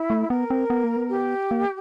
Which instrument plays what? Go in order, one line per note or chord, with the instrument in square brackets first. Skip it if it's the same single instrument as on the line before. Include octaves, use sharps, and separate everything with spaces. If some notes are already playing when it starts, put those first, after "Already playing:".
Already playing: [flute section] E4
[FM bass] A3
[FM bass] B3 [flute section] A#4
[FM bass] C4
B3
A#3
B3
[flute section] G4
[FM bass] A#3